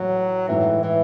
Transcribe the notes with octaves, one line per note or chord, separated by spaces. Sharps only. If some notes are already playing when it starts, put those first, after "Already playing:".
Already playing: A2 E3 F#3
A2 E3 G#3 D#4
E3